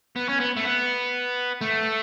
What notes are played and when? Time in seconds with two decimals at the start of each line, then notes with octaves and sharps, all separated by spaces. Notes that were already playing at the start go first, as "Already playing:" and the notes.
0.16 B3
0.29 C#4
0.40 B3
0.57 A3
0.65 B3
1.61 A3